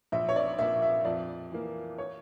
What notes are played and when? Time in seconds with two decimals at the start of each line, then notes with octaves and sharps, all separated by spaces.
0.12 A#1 E5
0.29 C#5
0.36 D5
0.59 A#2 F3 A#3 E5
0.82 E5
1.05 F2 D5
1.52 E3 A#3
1.98 C#5